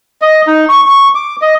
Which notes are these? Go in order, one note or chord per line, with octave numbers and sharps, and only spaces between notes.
D#5
D#4
C#6
C#6
D6
D#5